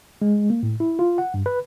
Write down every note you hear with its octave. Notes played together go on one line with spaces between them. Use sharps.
G#3
A#3
A2
E4
F4
F#5
G2
B4